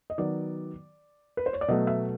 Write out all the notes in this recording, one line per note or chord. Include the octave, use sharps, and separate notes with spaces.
D#5
D#3 F#3 B3 D5
B4
C5
C#5
D5
B2 F#3 A3 D#5
E5